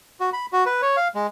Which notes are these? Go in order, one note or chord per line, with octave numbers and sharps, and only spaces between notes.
F#4
B5
F#4
B4
C#5
F5
G#3